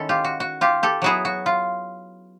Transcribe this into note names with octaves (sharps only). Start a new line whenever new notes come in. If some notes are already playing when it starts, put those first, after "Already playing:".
Already playing: D#3 G#3 C#4 E4 A4
F4 G4
F#4
F#4
F4 G4
G4 A4
F#3 B3 E4 F#4 G#4
F#4
F4